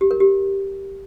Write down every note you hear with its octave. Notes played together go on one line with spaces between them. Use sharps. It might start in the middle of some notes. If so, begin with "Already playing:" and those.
G4
A#4
G4